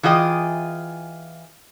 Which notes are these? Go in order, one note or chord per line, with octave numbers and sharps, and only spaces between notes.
E3 F4 G#4 D#5 G5